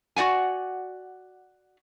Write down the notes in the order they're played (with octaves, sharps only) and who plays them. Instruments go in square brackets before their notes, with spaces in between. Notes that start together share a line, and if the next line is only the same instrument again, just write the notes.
[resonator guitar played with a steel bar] F#4 D5 F#5 G#5